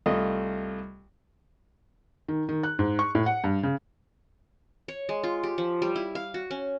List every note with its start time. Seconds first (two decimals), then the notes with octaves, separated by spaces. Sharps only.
0.06 C2 A3 F4 D#5
2.28 D#3
2.49 D#3
2.63 F#6
2.79 G#2
2.99 C#6
3.15 A2
3.26 F#5
3.44 G2
3.63 C#3
4.88 C#5
5.09 G#3
5.24 F4
5.43 G4
5.58 F3
5.82 G3
5.95 E4
6.15 F5
6.34 F#4
6.51 C#4